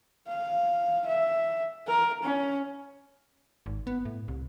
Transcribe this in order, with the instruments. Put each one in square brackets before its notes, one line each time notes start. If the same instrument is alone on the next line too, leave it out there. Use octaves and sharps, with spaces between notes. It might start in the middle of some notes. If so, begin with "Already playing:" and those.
[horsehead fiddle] F5
E5
A#4
C#4
[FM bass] G#1
B3
A2
C2